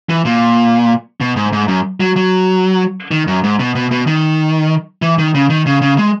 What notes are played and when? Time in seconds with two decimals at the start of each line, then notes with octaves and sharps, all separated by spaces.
0.09 E3
0.25 A#2
1.21 B2
1.36 G#2
1.53 G#2
1.68 F#2
2.00 F#3
2.16 F#3
3.11 D#3
3.27 F#2
3.44 G#2
3.60 B2
3.75 B2
3.91 B2
4.07 D#3
5.02 E3
5.18 D#3
5.34 C#3
5.50 D#3
5.66 C#3
5.82 C#3
5.98 G#3